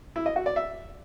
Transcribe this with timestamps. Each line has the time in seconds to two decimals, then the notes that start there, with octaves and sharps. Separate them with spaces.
0.16 E4
0.26 D#5
0.36 F#4
0.46 D5
0.56 E5